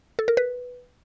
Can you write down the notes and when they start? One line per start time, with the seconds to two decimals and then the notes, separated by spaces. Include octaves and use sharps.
0.19 A4
0.28 A#4
0.37 B4